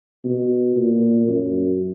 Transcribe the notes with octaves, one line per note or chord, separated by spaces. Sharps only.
B2
A#2
F#2